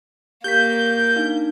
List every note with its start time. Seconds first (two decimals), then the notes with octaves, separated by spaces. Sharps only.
0.44 A#3 G4 G6 B6
1.16 D4 D#4 F5